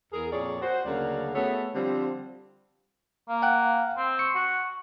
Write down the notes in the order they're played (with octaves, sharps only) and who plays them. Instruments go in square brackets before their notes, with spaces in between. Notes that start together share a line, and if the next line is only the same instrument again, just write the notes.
[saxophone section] E2 G#4 A#4
F2 A#2 G#4 C#5 D5
F#4 C5
D2 C#3 F#3 A#3 F#4 D5
A3 B3 F#4 G#4 A4 C#5
D3 F3 G3 C4
[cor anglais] A#3 [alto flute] F5
[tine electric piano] F#5 G5 F#6
[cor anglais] C4
[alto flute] C#6 [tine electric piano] C#7
[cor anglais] F#4